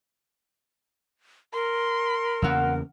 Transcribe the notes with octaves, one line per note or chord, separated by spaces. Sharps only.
A#4 C6
E2 C#3 A#3 F#4 F5 E6